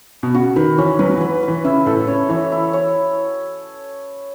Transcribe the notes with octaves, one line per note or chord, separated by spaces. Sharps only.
B2
C#3 F#4
D#3 B4
E3 C#4
F#3 B4
F#3
E3
B4
B4
E3
C#3 E4
A2 A4
C#3 C#5
E3 C#5
E4
C#5